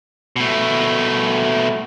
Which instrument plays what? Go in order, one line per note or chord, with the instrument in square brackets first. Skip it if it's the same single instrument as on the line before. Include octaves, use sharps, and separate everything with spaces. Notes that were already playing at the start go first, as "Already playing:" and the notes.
[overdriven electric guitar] B2 A3